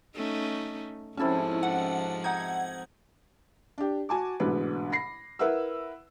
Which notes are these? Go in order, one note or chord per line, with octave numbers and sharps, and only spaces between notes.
A3 C#4 D#4
G#2 C3 F3 C#4 E4 A4 A5
F#5
D#4 F#5 G#6
D4 G4
F#4 G#5 A5 D6
A1 G#2 B2 D3 B4
B5 A#6 C7
E4 A#4 B4 E5 F#5 E6